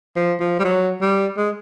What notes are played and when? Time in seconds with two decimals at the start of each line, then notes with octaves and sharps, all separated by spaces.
0.16 F3
0.40 F3
0.59 G3
0.64 F#3
1.01 G3
1.37 G#3